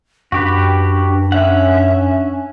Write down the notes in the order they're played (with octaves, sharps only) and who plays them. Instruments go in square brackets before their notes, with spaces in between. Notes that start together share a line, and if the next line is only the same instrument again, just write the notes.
[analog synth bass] F#2 [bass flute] D4 [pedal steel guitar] F#4 G4 B4
[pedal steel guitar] C#4 F#5 [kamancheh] E5